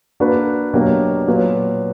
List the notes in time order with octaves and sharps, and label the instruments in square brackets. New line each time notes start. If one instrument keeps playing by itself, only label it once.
[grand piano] A#3 D4 F#4 B4
B2 F#3 A#3 D4 G4
A#2 F#3 B3